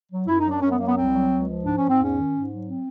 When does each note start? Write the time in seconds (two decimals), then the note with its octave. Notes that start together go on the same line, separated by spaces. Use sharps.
0.11 F#3
0.28 F#2 E4
0.39 D#4
0.45 F#3
0.50 D4
0.61 F#2 C#4
0.70 B3
0.79 F#3 A#3
0.87 B3
0.95 C2 C4
1.12 F#3
1.30 C#2
1.47 F3
1.63 G#2 D4
1.77 G#2 C#4
1.89 C4
1.98 E2 C#4
2.14 D#3
2.32 G#2
2.49 F#3
2.66 C4